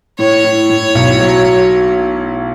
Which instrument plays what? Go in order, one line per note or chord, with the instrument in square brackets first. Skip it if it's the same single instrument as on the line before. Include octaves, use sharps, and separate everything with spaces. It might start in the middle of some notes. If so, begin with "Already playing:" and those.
[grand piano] A2 [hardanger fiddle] C#5
[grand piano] A2
A2
B1
F#3